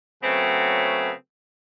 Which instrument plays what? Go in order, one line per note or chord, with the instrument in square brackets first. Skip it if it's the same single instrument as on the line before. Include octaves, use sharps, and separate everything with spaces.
[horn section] C#3 F#3 A3 B3 C4